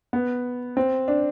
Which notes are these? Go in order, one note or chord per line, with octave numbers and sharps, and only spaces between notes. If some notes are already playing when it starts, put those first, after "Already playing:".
B3
C4
D4